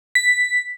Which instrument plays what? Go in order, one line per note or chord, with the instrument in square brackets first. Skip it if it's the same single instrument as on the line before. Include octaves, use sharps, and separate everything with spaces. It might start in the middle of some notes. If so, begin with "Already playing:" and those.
[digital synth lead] B6